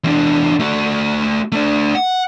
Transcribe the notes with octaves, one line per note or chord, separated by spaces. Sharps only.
E2 D4
A3 F#4
A3 D4
F#5